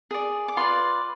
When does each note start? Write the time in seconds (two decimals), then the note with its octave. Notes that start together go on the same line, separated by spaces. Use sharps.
0.11 G#4 D5
0.48 D6
0.57 F4 B4 D5 C6